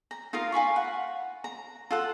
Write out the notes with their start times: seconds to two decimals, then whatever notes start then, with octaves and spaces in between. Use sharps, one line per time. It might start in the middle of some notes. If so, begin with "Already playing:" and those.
0.11 A#5
0.33 D#4 F4 A#4 F5
0.52 F5 G#5 B5 C#6
0.76 F#5
1.44 A#5
1.91 F4 A4 F#5